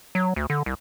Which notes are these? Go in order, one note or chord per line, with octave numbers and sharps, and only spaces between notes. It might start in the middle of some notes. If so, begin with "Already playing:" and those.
F#3
D2
D3
C2